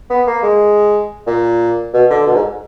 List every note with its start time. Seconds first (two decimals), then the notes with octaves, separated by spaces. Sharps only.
0.10 B3
0.27 A#3
0.43 G#3
1.26 A#2
1.93 B2
2.10 D3
2.26 B2
2.34 G#2